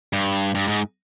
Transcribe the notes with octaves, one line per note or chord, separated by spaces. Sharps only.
G2
G2
G#2